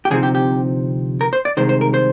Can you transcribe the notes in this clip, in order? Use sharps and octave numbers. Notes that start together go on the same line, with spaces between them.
G4
D2 C3 F3 C4 D#4 G#4
G4
G4
A#4
C5
D5
C2 C3 D#3 G#3 C5
C5
A#4
C5